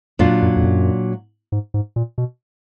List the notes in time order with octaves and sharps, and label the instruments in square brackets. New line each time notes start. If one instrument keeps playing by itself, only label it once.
[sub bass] F2 [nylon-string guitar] A#2 F#3 D4 F4
[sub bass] F#2
F2
F#2
G#2
G#2
A#2
B2